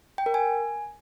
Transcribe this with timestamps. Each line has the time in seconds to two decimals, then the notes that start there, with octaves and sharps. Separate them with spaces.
0.18 G5
0.26 A#4
0.34 G#5